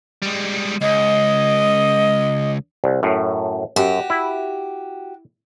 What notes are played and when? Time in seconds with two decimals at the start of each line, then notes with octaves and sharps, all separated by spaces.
0.22 G3 G#3
0.81 C#2 D#5
2.84 C2
3.03 F#2 A2
3.76 F#2 F#4 G4
4.10 E4